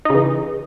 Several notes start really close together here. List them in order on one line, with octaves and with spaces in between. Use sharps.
D#4 C#3 E3